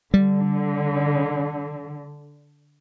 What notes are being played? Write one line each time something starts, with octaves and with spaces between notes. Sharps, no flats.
D3 G3